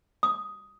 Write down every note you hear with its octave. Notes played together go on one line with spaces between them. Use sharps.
D#6